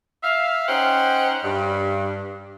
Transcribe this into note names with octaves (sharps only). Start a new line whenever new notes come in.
E5 F5
C#4 D#4 C5 F#5 G5
G2